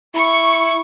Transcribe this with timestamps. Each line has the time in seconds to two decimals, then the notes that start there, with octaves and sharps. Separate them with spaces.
0.15 E4 C#6